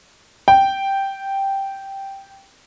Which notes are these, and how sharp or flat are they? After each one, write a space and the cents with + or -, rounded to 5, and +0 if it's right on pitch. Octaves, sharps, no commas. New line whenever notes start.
G5 -5